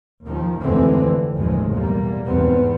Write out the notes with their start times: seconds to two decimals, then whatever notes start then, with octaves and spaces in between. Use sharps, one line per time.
0.24 D#2 D#3 F3
0.61 F1 D#2 D3 E3 G#3 C4
0.99 F2
1.36 F#1 D#2 A2 C3 F3 G#3
1.74 B1 E2 G3 A#3
2.26 G#1 E2 G3 B3 C4